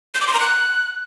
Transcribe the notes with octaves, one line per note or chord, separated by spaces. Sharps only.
G6
D6
C6
A#5
F#6